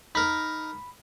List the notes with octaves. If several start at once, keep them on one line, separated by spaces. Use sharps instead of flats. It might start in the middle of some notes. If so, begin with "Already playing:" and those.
D#4 A#4 B5